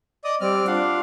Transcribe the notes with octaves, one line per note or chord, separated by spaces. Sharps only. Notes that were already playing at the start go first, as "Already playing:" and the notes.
D5 D#5 D#6
G3 C4 D5 F6
D4 F4 F5 F#5